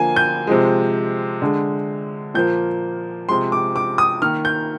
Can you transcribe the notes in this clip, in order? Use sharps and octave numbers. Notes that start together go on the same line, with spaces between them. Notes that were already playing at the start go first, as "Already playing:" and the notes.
Already playing: D3 F3 A#3 G#5
G6
C3 F3 G#3
D3 G#3
A#2 F3 A#3 G6
C3 F3 G#3 C6
D6
D6
D#6
D#3 A#3 F6
G6